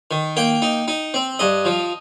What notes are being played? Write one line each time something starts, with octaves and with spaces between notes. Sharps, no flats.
D#3
A#3 G5
D#4
D#4
C4
G2 D#5
F3